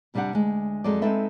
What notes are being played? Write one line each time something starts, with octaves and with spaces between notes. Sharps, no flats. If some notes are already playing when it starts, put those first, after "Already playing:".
F2 C3 G3 D4 G4 F#5
D2 G#3
F2 F#3 G#3 A4 D5
G#3 C4 D#4 A4 B4 E5